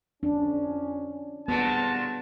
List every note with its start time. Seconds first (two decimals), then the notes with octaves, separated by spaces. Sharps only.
0.23 F2 C#4 D4
1.48 C2 A#2 D3 F#3 B3 G#4 A5